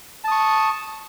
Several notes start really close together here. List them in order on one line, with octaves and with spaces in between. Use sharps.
A5 D#6 C#6